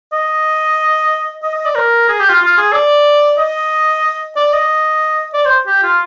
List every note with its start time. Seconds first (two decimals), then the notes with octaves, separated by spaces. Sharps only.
0.13 D#5
1.43 D#5
1.54 D#5
1.65 D5
1.75 A#4
2.08 G#4
2.20 G4
2.29 F4
2.41 F4
2.58 G#4
2.73 D5
3.38 D#5
4.36 D5
4.53 D#5
5.33 D5
5.45 C5
5.67 G4
5.83 F4